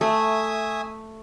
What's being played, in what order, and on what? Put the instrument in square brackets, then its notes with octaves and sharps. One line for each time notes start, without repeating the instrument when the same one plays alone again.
[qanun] A3 [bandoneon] E5 G#5 D#6